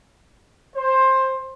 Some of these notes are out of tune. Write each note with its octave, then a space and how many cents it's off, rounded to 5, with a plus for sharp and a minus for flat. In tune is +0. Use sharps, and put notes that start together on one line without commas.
C5 +15